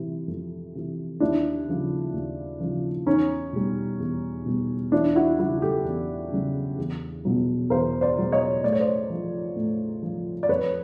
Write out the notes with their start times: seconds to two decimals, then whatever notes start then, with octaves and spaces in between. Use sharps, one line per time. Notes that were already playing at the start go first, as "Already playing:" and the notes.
Already playing: C3 E3
0.28 F2
0.75 C3 E3
1.20 D#2 D4 E4
1.68 C#3 F3
2.13 D#2
2.60 C#3 F3
3.06 E2 C#4 D#4
3.53 B2 G3
4.00 E2
4.46 B2 G3
4.92 E2 D4 E4
5.15 E4 F#4
5.39 C#3 F#3 E4 F#4
5.62 G4 A4
5.85 E2
6.32 C#3 F#3
6.78 E2
7.25 B2 F#3
7.70 E2 A#4 C5
8.01 C5 D5
8.18 B2 F#3
8.32 C#5 D#5
8.64 A2 D5
8.73 C#5
8.80 C5 D5
9.10 F3
9.56 A2
10.03 F3
10.43 D5
10.49 F2 B4 C#5